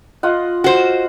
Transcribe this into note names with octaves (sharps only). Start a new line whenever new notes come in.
F4 D#5 F#5
F#4 C5